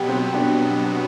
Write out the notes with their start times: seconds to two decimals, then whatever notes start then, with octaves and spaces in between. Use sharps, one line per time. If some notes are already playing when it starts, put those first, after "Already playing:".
Already playing: B2 F#3 B3 G4
0.09 C4
0.34 D4